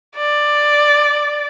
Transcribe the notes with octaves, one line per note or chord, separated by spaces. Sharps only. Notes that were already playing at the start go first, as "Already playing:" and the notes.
D5